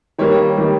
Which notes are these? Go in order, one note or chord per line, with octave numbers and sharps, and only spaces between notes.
D#3 G3 A#3 C#5
D#3 G3 A#3